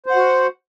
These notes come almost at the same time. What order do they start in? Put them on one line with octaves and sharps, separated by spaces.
C5 F#5 F#4